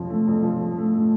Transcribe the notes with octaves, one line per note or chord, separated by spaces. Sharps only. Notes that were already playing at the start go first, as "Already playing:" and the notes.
Already playing: F2 F3 C#5
A3
F2
F3
F3
A3
A3